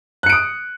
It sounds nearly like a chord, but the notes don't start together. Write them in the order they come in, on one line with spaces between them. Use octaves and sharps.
F#6 C#7 D7 D#6